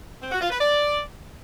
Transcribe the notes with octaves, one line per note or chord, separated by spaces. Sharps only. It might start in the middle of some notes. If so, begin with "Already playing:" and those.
C4
F#4
F4
B4
D5